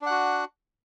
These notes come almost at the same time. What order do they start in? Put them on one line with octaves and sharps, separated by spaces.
D4 F#5 F#4